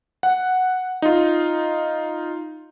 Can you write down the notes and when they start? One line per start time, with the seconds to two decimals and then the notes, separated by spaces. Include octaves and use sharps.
0.23 F#5
1.02 D#4 F4